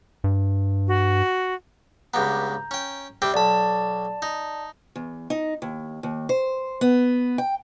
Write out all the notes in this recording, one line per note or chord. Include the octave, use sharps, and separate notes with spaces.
G2
F#4
C#2 G2 B3 A#5 G6
C#4 G5
C3 G3 C4
B1 D5 A5 B5
D#4
E2
D#4
D#2
D#2
C5
B3
G5